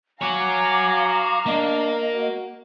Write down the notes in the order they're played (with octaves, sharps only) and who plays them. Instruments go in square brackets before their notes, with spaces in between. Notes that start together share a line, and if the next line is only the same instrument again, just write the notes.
[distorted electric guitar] F#4 C#5 [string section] F5 A#5 [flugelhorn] G#5 [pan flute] D6
[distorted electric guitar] A#3 [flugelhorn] D4 [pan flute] D#5
[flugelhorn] F#4